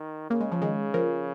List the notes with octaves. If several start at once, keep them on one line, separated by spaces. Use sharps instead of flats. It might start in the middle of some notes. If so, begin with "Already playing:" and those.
Already playing: D#3
C#3 A#3
G#3
F3
D#3 G#3
F3 A#3